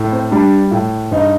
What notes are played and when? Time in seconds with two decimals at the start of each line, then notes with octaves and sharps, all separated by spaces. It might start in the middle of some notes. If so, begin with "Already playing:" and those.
Already playing: A2
0.12 C4
0.31 G3 D4
0.71 A2
1.11 G2 D#4